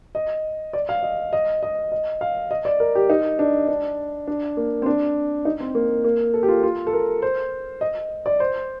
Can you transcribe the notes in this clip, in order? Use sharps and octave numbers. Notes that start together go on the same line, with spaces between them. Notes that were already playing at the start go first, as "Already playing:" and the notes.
D#5
D5
F5
D#5
D#5
D#5
D#5
F5
D#5
D5
A#4
G4
D#4
D4
D4
D4
A#3
C4
D4
D#4
C4
A#3
A#3
A4
G4
F4
F4
A4
A#4
C5
D#5
D5
C5